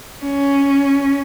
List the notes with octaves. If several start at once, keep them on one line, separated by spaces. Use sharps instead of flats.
C#4